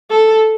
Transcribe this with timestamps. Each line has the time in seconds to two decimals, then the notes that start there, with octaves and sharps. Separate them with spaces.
0.10 A4